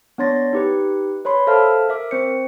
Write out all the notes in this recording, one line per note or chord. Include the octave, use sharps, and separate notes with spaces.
B3 D4 C#5 C6 A6 A#6
D#4 G4 B4
B4 C#5 B5 C6
A4 C5 E5 F5 A5 F6
A#4 E5 D6
C4 C5 C#7